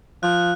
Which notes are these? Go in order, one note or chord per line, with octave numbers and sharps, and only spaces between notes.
F3 F#6